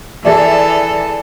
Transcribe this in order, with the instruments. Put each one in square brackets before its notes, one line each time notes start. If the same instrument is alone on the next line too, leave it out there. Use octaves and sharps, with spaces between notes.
[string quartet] E3 A4 [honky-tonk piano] G#4 D5 E5